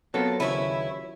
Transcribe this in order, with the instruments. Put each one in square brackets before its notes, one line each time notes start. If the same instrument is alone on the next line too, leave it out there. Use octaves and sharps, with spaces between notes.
[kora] F#3 F4 A#4 [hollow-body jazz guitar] B3 C4 [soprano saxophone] A4
[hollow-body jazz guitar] D#2 C#3 [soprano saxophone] E4 [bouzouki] B4 C#5